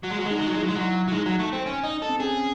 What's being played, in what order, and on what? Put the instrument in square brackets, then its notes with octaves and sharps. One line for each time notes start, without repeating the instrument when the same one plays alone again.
[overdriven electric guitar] F#3
G#3
F#3
G#3
[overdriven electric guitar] F#3 [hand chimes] D#4
[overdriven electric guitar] G#3
F#3
G#3
[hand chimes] E4
[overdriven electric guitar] F#3
G#3
F#3
[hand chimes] E4
[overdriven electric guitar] F#3
[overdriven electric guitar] G#3 [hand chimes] D#4
[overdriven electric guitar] F#3
A3
C4
C#4
D#4
A4
[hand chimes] C4
[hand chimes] C#4 [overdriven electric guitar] G#4